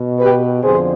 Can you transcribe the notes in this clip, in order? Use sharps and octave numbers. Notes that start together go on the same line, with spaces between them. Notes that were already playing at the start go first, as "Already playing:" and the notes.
Already playing: B2
G4 B4
F2 D3 F3 G#4 C5